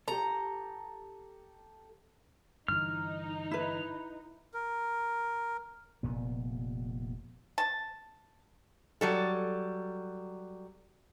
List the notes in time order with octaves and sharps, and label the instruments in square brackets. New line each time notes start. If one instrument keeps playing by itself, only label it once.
[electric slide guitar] G4 A4 [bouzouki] A#5
[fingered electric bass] G2 D3 E3 [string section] D#4 [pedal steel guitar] F6
[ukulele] E4 B4
[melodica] A#4
[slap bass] F1 A#2 B3
[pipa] A5
[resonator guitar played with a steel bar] F#3 G3 A4